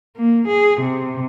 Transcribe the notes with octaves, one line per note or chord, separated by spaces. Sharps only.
A#3
G#4
C3